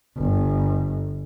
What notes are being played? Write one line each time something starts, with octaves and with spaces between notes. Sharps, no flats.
G1